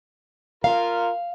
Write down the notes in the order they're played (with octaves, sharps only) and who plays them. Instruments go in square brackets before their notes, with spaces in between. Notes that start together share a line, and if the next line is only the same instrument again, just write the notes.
[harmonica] F4 A#4 [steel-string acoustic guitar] F5